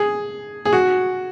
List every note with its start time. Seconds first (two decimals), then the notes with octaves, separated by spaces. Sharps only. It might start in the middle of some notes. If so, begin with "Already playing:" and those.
Already playing: G#4
0.65 G#4
0.73 F#4